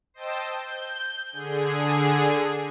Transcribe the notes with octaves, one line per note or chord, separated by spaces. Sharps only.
C5 D#5 G5 A5 E6
G6
D3 G#4